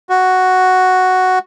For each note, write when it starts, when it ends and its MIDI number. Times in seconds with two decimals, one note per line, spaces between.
0.09 1.39 66